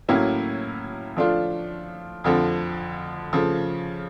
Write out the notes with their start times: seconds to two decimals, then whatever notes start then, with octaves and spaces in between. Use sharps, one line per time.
0.08 A2 F#3 A#3 C#4 E4
1.16 F3 A3 D4 F4
2.24 F2 D3 F3 A3
3.33 C#3 F3 A3